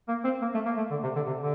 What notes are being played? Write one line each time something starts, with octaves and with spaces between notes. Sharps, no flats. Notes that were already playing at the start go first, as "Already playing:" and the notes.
A#3
C4
A#3
A3
A#3
A3
D3
C3
D3
C3
D3